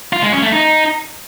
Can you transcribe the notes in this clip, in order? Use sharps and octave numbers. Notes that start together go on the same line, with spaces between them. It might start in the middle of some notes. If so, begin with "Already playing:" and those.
F4
G#3
C#4
A3
D#4